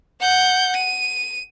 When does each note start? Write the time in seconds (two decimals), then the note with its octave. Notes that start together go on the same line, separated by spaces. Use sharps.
0.20 F#5 G6
0.76 D#7